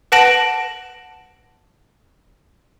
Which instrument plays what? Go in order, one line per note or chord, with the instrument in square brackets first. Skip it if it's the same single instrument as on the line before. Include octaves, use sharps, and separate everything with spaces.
[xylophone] B4 F#5 A5 A#6 D7 F#7